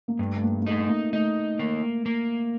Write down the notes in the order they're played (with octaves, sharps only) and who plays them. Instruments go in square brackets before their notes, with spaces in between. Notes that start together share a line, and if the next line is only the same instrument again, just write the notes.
[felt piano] A#3
[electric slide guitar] G2 [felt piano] A3
[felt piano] A3
A#3
A#3
[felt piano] A3 [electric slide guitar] D#4
[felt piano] A#3
[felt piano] A3 [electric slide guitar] D#4
[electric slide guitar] A#3
A#3